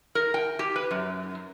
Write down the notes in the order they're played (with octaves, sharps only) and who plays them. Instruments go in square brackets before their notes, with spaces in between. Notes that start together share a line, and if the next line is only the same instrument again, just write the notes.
[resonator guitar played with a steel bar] A#4
G5
G4
B4
F#2